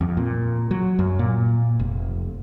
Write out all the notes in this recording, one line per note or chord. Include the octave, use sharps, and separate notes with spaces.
F2
A#2
F#3
F#2
A#2
F1